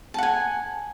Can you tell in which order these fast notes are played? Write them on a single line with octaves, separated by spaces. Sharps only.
A5 F#5 G#5